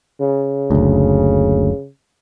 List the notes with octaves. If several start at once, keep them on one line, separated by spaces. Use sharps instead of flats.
C#3
F#1 D2